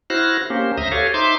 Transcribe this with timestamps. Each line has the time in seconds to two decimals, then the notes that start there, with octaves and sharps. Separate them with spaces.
0.10 E4 F#4 C5 F6 F#6 A#6
0.50 A#3 C#4 G4 C5
0.78 D2 C5 E5 A#5 D#6 A#6
0.92 F#4 G4 A4 C#5 F5 G#5
1.14 D#4 C5 E5 C6 D6